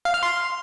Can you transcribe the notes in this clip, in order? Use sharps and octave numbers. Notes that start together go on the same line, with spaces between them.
F5
F6
C6